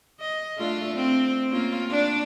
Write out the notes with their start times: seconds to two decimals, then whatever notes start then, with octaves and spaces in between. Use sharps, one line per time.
0.20 D#5
0.58 A3 D4 F4
0.94 C4
1.51 A#3 C#4 F4
1.91 D4